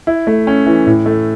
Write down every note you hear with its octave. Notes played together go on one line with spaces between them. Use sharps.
E4
A3
C#4
E3
A2
A3